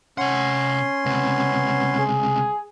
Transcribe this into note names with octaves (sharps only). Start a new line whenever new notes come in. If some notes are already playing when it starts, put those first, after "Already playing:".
C3 C#4 F#5 C6
C#2 C3 B3
G#4